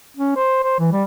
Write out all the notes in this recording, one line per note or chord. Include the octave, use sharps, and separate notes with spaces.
C#4
C5
C5
E3
G3